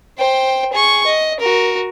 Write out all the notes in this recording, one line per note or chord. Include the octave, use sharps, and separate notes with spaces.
C5 G5
G#4 C#6
D#5
F#4 A#4